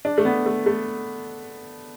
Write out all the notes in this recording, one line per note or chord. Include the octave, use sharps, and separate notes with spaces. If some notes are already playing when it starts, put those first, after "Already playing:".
D4
A3
B3
A3
A3